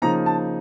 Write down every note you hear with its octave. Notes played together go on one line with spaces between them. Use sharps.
C#3 F3 A#3 D#4 A#5
A5